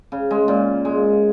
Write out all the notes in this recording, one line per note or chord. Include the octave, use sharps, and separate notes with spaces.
C#3
G#3
A#2
G#3